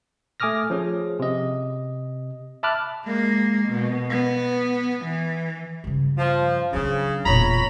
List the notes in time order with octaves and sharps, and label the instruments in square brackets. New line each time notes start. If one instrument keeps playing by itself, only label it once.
[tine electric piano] A3 G#5 D6 D#6 F6 A#6
F3 C#4 G#4
C3 D#5
E5 A5 B5 D6 F6 F#6
[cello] G#3 A#3
B2
B3
E3
[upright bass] G2 C#3
[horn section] F3
[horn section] C#3 [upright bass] F#3 D4
[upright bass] E1 A#2 [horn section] C#5 A#5 B5